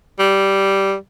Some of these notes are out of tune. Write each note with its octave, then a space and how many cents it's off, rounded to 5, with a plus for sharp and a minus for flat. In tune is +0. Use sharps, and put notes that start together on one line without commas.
G3 -5